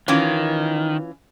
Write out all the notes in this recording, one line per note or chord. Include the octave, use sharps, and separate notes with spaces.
D#3 E3 C#4 F4